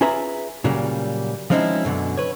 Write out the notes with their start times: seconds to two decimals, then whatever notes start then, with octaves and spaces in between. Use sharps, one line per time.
0.01 C#4 F4 G#4 B4 E5 A#5
0.64 A#2 C#3 F#3 G3 A#3
1.50 F3 G#3 C4 C#4 D#4 E4
1.85 F#2 B2 D3
2.17 B4 C#5